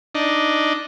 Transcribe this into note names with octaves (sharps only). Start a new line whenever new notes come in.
D4 D#4